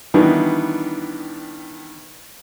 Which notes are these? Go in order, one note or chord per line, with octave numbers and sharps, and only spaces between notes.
D#3 E3 G3 B3 D4